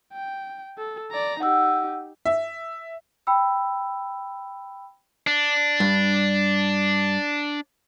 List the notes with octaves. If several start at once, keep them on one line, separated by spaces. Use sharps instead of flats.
G5
A4
D5 A#5
D#4 G4 F#5 E6
E5
G5 B5 E6
D4
G2